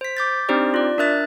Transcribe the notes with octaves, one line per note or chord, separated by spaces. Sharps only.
C5 B6
D6 G6 A6
C4 D4 D#4 G4 C5 D5
F4 D5
D4 A#4 E5 F#6 A6